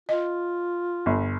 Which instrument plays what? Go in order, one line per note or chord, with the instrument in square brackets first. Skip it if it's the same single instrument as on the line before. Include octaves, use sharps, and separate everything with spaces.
[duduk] F4 [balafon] D#5
[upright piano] G1